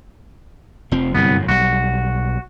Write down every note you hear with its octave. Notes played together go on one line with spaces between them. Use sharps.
F1 F3 C4
G1 C2 F#2 A2 B3
B1 G3 F#4